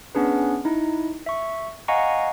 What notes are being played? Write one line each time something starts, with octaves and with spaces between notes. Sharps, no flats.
B3 C#4 D4 G#4 B4
D#4 E4
E5 C#6
D#5 F5 F#5 G#5 A#5 C#6